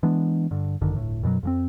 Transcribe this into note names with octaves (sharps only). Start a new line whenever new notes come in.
E3 G#3 B3 D4
G2 D3
G#1 F#2 D3 D#3
D1 G1 A2
F#2 B2 D#3 F#3
F2 E3 C4